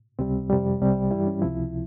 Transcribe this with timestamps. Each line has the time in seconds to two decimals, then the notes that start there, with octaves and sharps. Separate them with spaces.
0.19 C#2 C3 G3 C4
0.50 F2 C3 G3
0.80 C2 C3 G3
1.11 G2 E3 G3 E4
1.27 C#4
1.42 C#2 C3 F3 E4